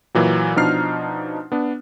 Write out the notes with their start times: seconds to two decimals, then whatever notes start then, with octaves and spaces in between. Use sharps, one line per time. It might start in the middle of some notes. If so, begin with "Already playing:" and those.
0.15 A#2 E3 F#3
0.56 B2 F3 D4 D#4 F6 C7
1.52 B3 D4